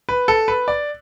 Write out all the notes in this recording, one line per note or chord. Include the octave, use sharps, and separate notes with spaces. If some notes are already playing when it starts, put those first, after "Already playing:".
B4
A4
B4
D5